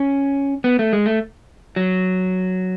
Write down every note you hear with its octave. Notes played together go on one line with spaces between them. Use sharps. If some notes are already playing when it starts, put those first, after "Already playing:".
Already playing: C#4
B3
A3
G#3
A3
F#3